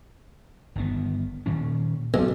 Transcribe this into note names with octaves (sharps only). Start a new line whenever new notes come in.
G1 D#3 B3
A#2 D#3 C#4
B1 A#2 A3